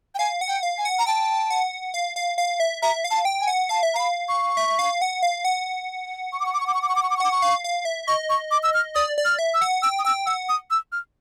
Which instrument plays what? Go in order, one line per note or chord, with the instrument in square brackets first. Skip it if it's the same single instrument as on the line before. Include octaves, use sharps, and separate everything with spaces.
[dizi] G5
[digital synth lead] F5 [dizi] G#5
[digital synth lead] F#5
[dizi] G5
[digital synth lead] F5
[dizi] G#5
[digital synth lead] F#5
[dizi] A#5
[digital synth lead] G5 [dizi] A5
[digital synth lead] F#5
F5
F5
F5
E5
[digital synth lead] E5 [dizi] A#5
[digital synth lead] F5
[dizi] A5
[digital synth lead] G5
[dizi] G#5
[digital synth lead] F#5
[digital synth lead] F5 [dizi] A5
[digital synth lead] E5
[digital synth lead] F5 [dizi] A#5 B5
[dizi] C#6
[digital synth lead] E5
F5
F#5
F5
F#5
[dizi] C#6
D6
C#6
D6
C#6
D6
C#6
D6
C#6
D6
C#6
D6
C#6
[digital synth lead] F#5 [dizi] D6
[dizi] C#6
[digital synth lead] F5
F5
E5
[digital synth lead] D#5 [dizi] C#6
[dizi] C#6
D6
E6
F6
[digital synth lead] D5 [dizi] D#6
[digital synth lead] D5
[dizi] F6
[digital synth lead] E5
[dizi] E6
[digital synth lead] F#5
[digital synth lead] G5 [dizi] E6
[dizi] D#6
[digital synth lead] G5 [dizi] E6
[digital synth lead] F#5 [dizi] E6
[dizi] D#6
E6
F6